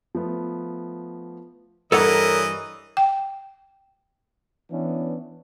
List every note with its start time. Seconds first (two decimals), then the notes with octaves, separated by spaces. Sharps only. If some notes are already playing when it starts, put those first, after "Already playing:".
0.15 F3 A3 B3
1.92 G2 E3 D4 A4 A#4 C#5 D#5 F#5
2.97 G5
4.71 E3 B3 C#4 D4